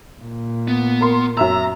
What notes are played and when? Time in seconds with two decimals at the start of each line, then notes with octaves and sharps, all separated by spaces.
0.22 A#2
0.68 B3
1.01 A#4 C6
1.37 F#2 E5 A#5 E6